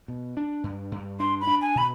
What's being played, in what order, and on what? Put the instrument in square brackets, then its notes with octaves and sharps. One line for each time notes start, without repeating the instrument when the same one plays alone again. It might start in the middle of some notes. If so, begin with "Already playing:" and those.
[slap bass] B2
D4
G2
G2
[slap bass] D4 [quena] C6
[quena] B5
[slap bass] D4
[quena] G#5
[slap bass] B2 [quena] B5